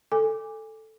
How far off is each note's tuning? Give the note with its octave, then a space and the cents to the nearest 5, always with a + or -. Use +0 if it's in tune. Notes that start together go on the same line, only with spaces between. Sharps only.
A4 +0 G#5 -25 D6 +0